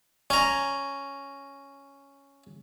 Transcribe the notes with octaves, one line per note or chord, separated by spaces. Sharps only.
C#4 A#5